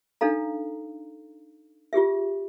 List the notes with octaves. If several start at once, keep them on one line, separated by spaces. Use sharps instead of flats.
D4 D#4 A4 F5 A#5
F4 G4 G#4 E5